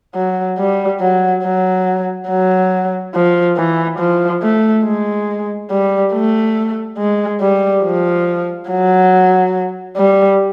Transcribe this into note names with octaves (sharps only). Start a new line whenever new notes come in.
F#3
G3
F#3
F#3
F#3
F3
E3
F3
A3
G#3
G3
A3
G#3
G3
F3
F#3
G3